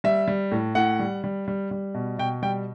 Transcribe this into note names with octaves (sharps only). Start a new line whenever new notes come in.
G3 E5
G3
A2
A2 F#5
G3
G3
G3
G3
B2
B2 G5
G3 G5